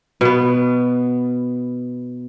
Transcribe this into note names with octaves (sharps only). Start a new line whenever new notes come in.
B2 B3